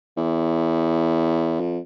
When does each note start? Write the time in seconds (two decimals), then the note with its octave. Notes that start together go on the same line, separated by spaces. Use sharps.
0.17 E2
1.60 F2